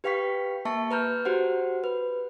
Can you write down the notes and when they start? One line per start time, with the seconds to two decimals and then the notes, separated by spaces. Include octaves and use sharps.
0.04 G4 B4 F5 G5 C#6 B6
0.65 A#3 E5 A5 C#6
0.91 B4 A#5 F6 G6
1.25 F#4 G4 C5 F#5
1.84 B4